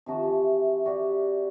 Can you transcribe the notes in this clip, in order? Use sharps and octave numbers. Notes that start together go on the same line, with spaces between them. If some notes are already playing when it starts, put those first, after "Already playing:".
C3 D#3 F3 F#4
E3
F#4 G4 D5